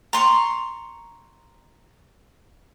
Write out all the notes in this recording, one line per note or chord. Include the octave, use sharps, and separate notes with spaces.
A#5 C6 C#6